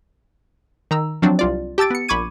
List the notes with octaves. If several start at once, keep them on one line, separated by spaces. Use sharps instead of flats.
D#3 A#5 E6
F3 F#3 C4 D4
C2 F4 D5
G4 A5 E6 A6 D7
B3 C#7
A#1 B5 C#6 D6 G#6 D#7